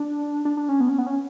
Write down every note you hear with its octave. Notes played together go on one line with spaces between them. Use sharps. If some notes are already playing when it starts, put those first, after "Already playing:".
Already playing: D4
D4
D4
C#4
B3
C#4
B3
C#4